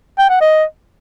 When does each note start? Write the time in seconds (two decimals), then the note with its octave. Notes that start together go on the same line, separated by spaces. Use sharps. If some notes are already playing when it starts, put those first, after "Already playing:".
0.19 G5
0.30 F#5
0.41 D#5